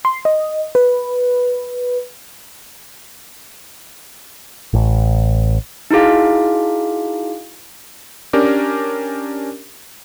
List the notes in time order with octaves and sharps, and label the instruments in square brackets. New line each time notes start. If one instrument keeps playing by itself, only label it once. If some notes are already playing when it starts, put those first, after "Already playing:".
[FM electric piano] C6
D#5
B4
[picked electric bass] A1
[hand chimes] D#4 E4 F#4 G#4 F5
[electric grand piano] C#4 D4 G4 A#4 D5